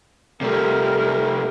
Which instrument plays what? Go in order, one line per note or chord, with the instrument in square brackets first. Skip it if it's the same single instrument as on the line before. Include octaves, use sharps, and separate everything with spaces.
[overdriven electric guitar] C3 A3 [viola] G3 A#4